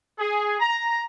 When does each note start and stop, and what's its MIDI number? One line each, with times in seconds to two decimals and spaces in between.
0.19 0.58 68
0.59 1.04 82